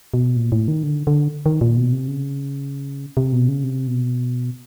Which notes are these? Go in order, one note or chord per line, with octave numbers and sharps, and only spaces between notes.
B2
A#2
A2
D#3
D3
D3
D#3
A#2
B2
C3
C#3
C3
B2
C#3
C3
B2